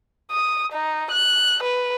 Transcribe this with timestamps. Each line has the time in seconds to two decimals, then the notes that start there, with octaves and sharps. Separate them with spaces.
0.31 D#6
0.73 D#4
1.11 F#6
1.63 B4